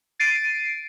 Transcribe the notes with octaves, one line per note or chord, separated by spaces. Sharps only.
A6 C7 D7 D#7